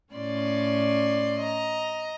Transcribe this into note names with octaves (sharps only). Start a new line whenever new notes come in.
A2 C#4 D5 C6
D#5 A#5